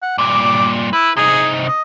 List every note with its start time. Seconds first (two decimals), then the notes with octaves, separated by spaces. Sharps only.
0.02 F#5
0.18 G2 A#2 D6
0.93 E4 B4
1.17 C3 D#4 G#4
1.67 D#5